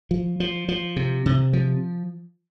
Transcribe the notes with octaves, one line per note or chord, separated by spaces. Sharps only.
F3
F3
F3
C3
C3
F3